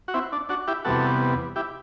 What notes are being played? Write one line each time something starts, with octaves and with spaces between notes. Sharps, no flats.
F#4
C4 E4
D4
D4 F#4
E4 G4
E2 C3 G3 B3 F#4 A4
E4 G4